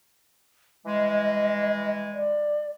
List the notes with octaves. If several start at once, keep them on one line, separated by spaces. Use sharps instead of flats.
E3 G3 G#3 D#5
D5